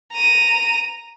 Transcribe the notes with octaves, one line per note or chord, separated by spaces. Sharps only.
A#5 D#7